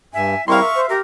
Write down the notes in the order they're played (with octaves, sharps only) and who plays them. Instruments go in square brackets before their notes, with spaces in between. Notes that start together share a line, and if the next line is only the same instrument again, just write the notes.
[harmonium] G2 [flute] E5 [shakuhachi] G#5
[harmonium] G3 C4 E4 [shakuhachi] A#4 [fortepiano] F5 C6 [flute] C#6
[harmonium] E5
[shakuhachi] C5
[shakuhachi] G4 [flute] A#4